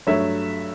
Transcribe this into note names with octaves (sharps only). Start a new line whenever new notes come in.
G2 F#3 A3 C#5 E5